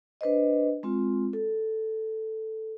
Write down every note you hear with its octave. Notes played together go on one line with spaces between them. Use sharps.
D4 B4 C5 D#5
G#3 C4 F4
A4